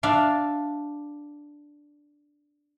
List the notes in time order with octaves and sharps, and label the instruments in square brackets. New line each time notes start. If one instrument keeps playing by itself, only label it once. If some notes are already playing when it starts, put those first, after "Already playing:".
[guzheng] D4 D5 E5 F5